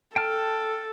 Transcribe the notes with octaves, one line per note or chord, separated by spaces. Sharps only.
A4 G5 A5 F6